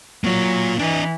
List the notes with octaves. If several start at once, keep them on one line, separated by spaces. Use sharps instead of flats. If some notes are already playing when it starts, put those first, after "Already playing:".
F#3 A#3 F4
E3 D4 D#5